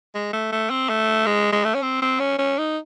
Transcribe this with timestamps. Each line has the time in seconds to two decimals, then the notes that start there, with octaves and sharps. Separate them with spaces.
0.15 G#3
0.33 A3
0.52 A3
0.70 C4
0.89 A3
1.26 G#3
1.52 G#3
1.64 A3
1.75 C#4
1.82 C4
2.02 C4
2.20 C#4
2.38 C#4
2.58 D#4